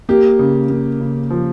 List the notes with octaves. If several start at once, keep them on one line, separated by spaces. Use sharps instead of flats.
A#3 G4
C#3
A#3
C#3
F3